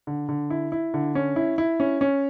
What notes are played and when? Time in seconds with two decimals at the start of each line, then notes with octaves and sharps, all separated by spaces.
0.07 D3
0.29 D3
0.50 E4
0.72 E4
0.94 D3
1.15 C#4
1.36 E4
1.58 E4
1.80 C#4
2.01 C#4